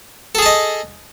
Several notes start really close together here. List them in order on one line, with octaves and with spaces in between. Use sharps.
A4 G#4 A5 D#5